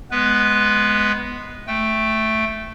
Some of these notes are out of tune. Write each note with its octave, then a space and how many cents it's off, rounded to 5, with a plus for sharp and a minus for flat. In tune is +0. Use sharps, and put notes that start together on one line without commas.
G#3 +10 B3 +0 B4 +0
A3 +0 G5 +10